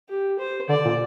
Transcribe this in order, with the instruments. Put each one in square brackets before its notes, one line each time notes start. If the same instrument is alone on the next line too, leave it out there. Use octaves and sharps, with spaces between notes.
[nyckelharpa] G4
C5
[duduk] D3 [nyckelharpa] D5
[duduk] A#2